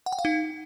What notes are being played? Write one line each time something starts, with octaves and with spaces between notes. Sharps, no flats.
F#5
G5
F5
D#4